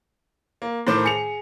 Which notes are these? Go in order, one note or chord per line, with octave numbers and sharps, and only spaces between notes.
A#3
A2 D#3 C5 D6
G#4 C#7 F7